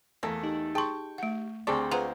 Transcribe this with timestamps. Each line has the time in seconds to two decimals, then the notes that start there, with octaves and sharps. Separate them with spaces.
0.23 E2 A3 A#3 A4
0.43 D#4 G4
0.75 G#4 G5 A5 C6 C#6
1.18 A3 F#5
1.67 D2 G3 C4 D4 G#4 D5 C#6
1.91 G#3 F4 B4 C5 F#5 A#5